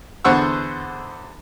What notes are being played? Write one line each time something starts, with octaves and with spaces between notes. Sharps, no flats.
E2 D3 C5 F#5 C#6 E6